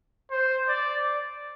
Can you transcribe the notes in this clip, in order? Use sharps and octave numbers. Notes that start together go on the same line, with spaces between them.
C5
D5